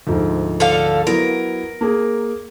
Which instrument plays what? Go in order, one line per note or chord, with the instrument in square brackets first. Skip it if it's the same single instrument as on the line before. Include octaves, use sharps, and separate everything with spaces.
[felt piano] D2 G#2 F3
[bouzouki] D3 A4 F5
[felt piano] F#3 B3 E4 [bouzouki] A#4
[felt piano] A#3 G#4